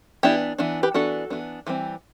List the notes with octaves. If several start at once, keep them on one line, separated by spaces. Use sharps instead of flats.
E3 B3 D4 E4 G4
E3 B3 D4
G4 B4
E3 B3 D4 F#4 A4
E3 B3 D4
E3 G3 C4